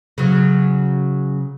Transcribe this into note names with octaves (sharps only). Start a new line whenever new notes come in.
C#3 F#3